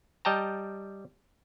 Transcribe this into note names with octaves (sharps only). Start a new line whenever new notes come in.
G3 D#5 G5 A5 A#5